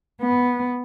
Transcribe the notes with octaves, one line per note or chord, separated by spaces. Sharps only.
B3